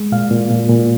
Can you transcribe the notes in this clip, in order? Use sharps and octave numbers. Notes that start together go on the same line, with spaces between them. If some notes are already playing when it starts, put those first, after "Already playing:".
Already playing: G#3
A#2 F5
A#2
A#2
A#2